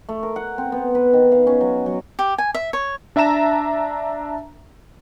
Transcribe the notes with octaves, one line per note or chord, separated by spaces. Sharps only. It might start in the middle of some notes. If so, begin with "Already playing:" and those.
A3
A#4
F#5
C4
B3
B4
D#3
F5
C#4
F#3
F#3
G4
G#5
E5
C#5
D4 E5 A5 A#5 E7